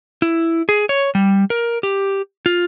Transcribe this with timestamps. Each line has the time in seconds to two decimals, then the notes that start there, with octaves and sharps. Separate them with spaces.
0.22 E4
0.69 G#4
0.89 C#5
1.15 G3
1.50 A#4
1.83 G4
2.46 F4